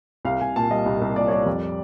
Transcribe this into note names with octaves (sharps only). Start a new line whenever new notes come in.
C2 F5
C2 G#5
A#2 A5
G3 D#5
C2
C2
A#2 D5
C#5
G3 D5
F2